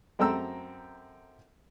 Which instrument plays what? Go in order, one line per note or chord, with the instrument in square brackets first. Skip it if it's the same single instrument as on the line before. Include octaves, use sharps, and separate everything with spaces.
[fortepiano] F#2 C4 A4 G5 A#5 E6